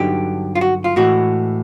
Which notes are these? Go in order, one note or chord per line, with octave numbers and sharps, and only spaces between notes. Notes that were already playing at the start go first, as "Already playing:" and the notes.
Already playing: G2 D3 F#3 B3 D#4 G4
F4
F#4
F4
A2 E3 G#3 F#4